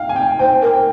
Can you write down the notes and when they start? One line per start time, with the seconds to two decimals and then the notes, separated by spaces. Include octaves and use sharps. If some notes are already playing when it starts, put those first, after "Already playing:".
Already playing: F5 G5
0.09 G#5
0.16 G5
0.39 C5 G5
0.62 A#4
0.74 G5